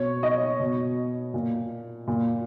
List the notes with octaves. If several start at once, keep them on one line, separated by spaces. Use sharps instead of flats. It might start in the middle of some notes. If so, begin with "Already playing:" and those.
Already playing: B2 C#5
D#5
B2
A#2
A#2